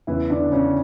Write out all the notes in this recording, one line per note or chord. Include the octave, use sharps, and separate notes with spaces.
E2 C#3 E3 E4
D3 D4
C#3 C#4